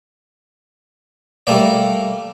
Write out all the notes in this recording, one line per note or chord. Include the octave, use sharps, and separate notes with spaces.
G3 A3 A#3 D5